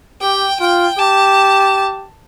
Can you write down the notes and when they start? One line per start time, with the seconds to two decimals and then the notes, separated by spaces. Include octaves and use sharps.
0.21 G4 G5
0.60 F4 G5
0.98 G4 A5